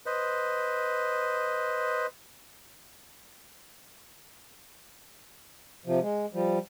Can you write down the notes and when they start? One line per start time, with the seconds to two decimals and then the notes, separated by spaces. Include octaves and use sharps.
0.06 B4 C5 D#5
5.86 C3 F3
6.01 G#3
6.33 F3 G3